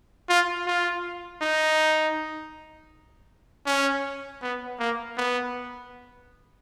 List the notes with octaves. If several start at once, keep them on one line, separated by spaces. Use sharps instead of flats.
F4
F4
D#4
C#4
B3
A#3
B3